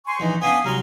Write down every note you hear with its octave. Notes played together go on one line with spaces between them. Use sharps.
G#5 C6 C#6
A#1 E3 D#4
B3 C#4 D4 F5 G#5 D#6
C2 F#3 A#5 C6 F6